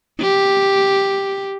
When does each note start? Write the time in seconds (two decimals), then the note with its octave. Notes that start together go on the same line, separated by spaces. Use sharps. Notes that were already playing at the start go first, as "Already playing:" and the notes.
0.21 G4